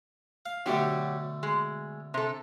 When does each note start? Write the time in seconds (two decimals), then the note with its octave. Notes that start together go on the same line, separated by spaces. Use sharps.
0.46 F5
0.66 B2 D3 F#3 A3 G4
1.43 G#3
2.14 C3 A4